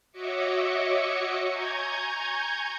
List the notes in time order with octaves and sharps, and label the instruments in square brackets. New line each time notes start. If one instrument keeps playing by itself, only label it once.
[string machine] F#4 C#5 D#5 E5 D6 C#7
G#5 A#5 C#6 G6 G#6